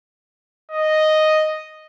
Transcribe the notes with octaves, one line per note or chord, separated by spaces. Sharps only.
D#5